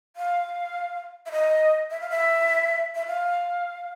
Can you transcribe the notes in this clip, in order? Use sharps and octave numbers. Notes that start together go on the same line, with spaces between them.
F5
E5
D#5
E5
F5
E5
E5
F5